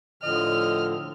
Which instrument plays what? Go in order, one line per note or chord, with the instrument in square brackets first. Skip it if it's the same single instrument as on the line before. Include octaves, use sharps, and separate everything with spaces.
[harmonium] A2 D3 F3 [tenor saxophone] D#5 [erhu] F6